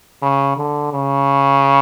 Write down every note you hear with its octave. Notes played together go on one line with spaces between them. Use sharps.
C#3
D3
C#3